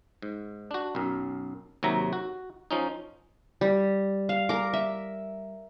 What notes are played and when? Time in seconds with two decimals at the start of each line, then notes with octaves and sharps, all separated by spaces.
0.22 G#2
0.71 D4 F#4
0.95 B1 F#2
1.83 D#2 C3 F#3 E5 A#5
2.13 F#4
2.71 F3 C#4 D#4
3.61 G3
4.29 F5
4.49 A#4 D6
4.73 E5